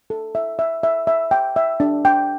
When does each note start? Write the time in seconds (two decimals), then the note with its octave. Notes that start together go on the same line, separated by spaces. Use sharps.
0.10 A4
0.35 E5
0.59 E5
0.83 E5
1.07 E5
1.31 G5
1.56 E5
1.80 D4
2.05 G5